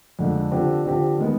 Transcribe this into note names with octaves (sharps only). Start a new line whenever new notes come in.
F2 D3 G#3
D3 F3 C4 G4
D3 F3 C4 G4
D#3 G#3 B3